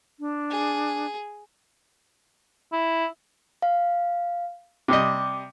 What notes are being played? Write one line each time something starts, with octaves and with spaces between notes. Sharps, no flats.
D4
G#4
E4
F5
C3 G3 D#5 D6